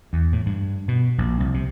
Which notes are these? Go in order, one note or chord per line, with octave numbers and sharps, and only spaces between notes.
E2
A2
G2
B2
A#1
C2
C3